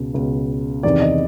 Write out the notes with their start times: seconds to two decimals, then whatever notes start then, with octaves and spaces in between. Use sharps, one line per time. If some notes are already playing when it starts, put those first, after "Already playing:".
Already playing: C#2 B2
0.14 C#2 B2
0.83 E2 C3 D#3 D5
1.02 D#5